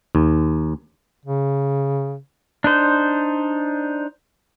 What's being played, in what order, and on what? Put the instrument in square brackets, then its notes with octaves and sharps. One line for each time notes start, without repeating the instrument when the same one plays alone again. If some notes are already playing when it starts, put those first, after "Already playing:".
[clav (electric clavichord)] D#2
[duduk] C#3
[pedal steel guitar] D4 D#4 C5